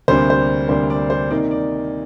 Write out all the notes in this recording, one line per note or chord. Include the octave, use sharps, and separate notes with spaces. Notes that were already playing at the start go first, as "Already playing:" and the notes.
D2 C3 G3 A#3 D4 C5
C5
D2 C3 G3 A#3 D4 C5
D5
C5
C3 D#3 A#3 D#4 D5
D5